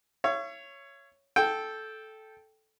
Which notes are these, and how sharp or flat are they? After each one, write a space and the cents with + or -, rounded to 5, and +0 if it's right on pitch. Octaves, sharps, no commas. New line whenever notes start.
C#5 +0 E5 +45
A4 -10 G5 +0